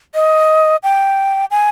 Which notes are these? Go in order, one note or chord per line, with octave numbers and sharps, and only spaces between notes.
D#5
G5
G#5